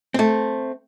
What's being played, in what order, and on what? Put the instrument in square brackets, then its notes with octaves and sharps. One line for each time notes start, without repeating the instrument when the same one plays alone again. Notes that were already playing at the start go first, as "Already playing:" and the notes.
[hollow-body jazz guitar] A3 C4